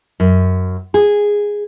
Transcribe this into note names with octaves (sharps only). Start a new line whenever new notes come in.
F#2
G#4